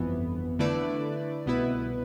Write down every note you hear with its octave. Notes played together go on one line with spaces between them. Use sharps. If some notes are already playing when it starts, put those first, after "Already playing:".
Already playing: G1 F2 E3 B3
D3 A3 E4 B4 D5
C2 B2 B3 E4 B4